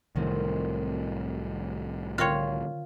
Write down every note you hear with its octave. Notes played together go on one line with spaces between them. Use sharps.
C2 A2 D#3 F#3 C4
D3 F4 A#4 C#5 G5